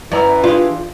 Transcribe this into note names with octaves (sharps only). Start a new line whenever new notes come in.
F#2 E3 D5 A#5
D4 F4 G4 G#4